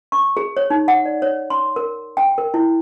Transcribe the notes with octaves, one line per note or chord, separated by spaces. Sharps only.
C#6
G#4
C#5
D#4
F#5
D5
C#5
C6
A#4
G5
A#4
E4